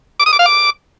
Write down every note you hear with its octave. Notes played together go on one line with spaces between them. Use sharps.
D6
D#6
D6
F5
D6